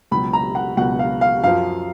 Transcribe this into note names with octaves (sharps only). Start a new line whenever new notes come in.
C#2 B2 F#3 B5
A#5
F#5
C#2 B2 F#3 F#5
F5
F5
F#2 F3 F5